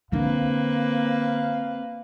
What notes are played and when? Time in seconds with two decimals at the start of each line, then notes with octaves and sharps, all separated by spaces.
0.12 D3 A#3 C4 D4 B4 F5